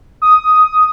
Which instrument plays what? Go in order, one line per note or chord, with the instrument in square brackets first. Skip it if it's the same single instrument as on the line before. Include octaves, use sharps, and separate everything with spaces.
[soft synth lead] D#6